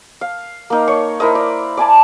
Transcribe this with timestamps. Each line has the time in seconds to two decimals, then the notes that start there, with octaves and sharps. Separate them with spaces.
0.21 F5
0.70 A#3 D#4
0.87 C#5 C#6
1.20 E4 A#4 C5 D#5
1.35 D5
1.77 D5 G#5 A5